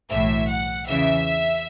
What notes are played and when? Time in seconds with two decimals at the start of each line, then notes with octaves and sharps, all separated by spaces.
0.10 B1 A2 E3 E5
0.48 F#5
0.86 E2 C#3 E3 E5